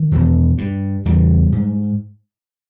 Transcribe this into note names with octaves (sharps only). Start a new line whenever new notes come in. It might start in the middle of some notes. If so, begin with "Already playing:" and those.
Already playing: D#3
E2 B2
G2
E2 C#3 G3
G#2